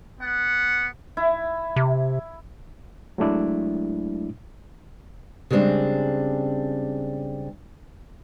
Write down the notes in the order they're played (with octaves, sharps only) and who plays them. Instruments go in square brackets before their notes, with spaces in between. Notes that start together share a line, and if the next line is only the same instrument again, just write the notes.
[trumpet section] B3 F#5
[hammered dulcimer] E4
[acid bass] C3
[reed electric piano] F#3 G#3 A3 D4 E4
[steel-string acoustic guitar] C#3 G3 G#3 C4 D4